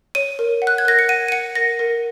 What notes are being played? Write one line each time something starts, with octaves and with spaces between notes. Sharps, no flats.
C#5 D#7
A#4
F#5
F#6
G#6
A#4 A#6
C#7
F#5 D#7
D#7
F#5 C#7
A#4 A#6
A#4